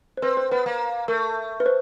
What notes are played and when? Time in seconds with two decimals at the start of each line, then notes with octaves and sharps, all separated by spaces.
0.17 C5
0.22 C4 B4
0.37 C5
0.51 B3 B4
0.66 A#3
1.08 A3 A#4
1.60 B4
1.66 C5